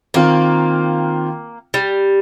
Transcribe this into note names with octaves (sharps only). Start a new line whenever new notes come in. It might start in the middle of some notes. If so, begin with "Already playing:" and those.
D#3 A#3 C4 F4
G3